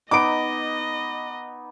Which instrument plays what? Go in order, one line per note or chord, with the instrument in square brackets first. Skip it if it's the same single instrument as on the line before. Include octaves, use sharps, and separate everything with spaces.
[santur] B3 D#4 [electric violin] D#5 [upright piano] D6 D7